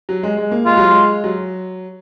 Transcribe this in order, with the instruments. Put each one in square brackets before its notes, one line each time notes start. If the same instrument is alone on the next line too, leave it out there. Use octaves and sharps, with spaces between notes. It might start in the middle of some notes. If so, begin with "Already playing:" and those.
[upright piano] F#3
G#3
G#3
A#3
[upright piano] G#3 [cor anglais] F4
[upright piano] F#3
G#3
F#3